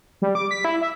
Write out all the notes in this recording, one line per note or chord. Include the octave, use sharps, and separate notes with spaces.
G3
D6
B6
E4
E5